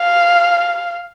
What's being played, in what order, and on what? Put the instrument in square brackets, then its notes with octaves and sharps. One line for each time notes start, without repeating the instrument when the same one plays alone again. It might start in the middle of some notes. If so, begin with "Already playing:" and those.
Already playing: [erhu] F5